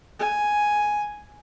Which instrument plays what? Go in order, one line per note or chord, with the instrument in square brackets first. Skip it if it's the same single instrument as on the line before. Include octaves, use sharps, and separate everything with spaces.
[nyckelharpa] G#5